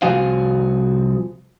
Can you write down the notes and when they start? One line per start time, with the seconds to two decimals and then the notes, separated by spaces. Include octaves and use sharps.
0.02 C2 F3 F#4 G#4 C5 F5